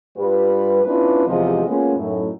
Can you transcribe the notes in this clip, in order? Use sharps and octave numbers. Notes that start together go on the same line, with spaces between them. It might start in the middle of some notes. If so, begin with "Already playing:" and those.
G2 G3 F4 B4
B3 C#4 D4 E4 F4 B4
E2 C3 F3 G#3 G4 D#5
G#3 A#3 B3 C#4 F4 G#4
F#2 A2 D#4